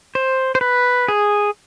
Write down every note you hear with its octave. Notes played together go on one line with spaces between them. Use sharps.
C5
C5
B4
G#4